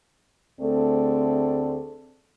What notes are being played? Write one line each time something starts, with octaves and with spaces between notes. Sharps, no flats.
D2 A3 C4 G#4 A4 D5